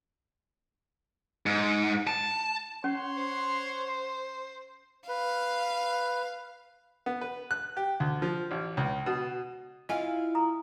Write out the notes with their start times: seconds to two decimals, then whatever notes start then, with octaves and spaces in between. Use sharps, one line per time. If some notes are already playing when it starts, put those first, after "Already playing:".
1.46 G#2
2.07 A5
2.84 C#4 C#5 F#5 C6
3.17 C5
5.09 B4 F5
7.06 B3
7.21 B4
7.51 F#6
7.77 G4
8.00 D2
8.22 F3
8.51 A1
8.77 C#2
9.06 B2
9.89 E4 F4 D#5 F5 G#5
10.35 A#5 D#6